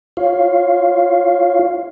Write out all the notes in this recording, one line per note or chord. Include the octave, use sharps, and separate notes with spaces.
F4 C#5 F5